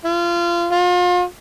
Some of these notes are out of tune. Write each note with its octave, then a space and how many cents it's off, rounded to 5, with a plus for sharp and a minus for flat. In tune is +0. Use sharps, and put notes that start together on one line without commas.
F4 -25
F4 +35